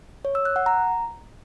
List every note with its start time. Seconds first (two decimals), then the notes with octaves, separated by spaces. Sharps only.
0.25 C#5
0.35 E6
0.45 F#6
0.56 F#5
0.66 A#5